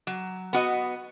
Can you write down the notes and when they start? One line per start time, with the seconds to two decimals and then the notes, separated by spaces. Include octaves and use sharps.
0.07 F#3
0.53 B3 F#4 D#5